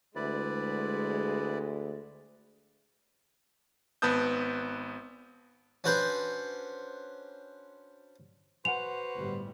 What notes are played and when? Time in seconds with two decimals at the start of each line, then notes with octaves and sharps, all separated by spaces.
0.16 D2 G#3 E4 B4 D5
4.02 G#1 B3 B4 A5 D#6 G6
5.84 C#4 D4 F#4 B4 C5
8.65 F#4 B4 C5 F#5 G#5 F7
9.16 G1 A2 G3